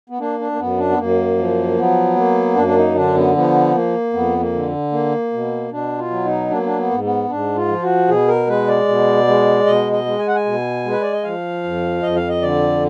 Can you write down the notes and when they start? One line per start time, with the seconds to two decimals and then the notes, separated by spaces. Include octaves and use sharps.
0.10 B3
0.19 A#3 D4
0.39 D4
0.52 A#3
0.59 F#2 B3
0.78 D4
0.90 B3
0.98 F#2 A#3
1.38 F3
1.77 F#3 B3
2.16 A#3
2.55 F#2 D4
2.67 D4
2.76 D#4
2.95 D3 D4
3.15 B3
3.35 F3 B3
3.74 A#3
4.13 F2 B3
4.40 A#3
4.54 D3
4.92 A#3
5.33 B2
5.71 B2 D4
5.98 F4
6.10 F#3
6.24 D#4
6.50 A#3 D4
6.58 B3
6.66 D4
6.77 B3
6.91 G#2
7.04 B3
7.29 G#2 D4
7.56 F4
7.68 F3
7.82 F#4
8.08 B2 G#4
8.28 A#4
8.47 G#3 B4
8.68 D5
8.88 B2
9.27 G#3
9.66 B2 D#5
9.92 D#5
10.06 G#3
10.19 G#5
10.28 F#5
10.35 G#5
10.45 B2
10.85 G#3
10.91 B4
11.02 D5
11.13 D#5
11.24 F3 F5
11.64 F2
12.03 F2 D#5
12.16 F5
12.29 D#5
12.42 D3 D5